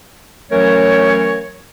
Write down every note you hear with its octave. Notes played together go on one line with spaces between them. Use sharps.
E3 F#3 A3 C#4 A#4 C#5